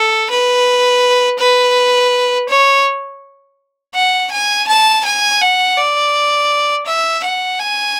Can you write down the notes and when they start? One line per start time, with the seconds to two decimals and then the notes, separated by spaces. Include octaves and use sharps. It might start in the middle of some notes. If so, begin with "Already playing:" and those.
Already playing: A4
0.30 B4
1.39 B4
2.49 C#5
3.95 F#5
4.31 G#5
4.68 A5
5.05 G#5
5.41 F#5
5.77 D5
6.87 E5
7.24 F#5
7.60 G#5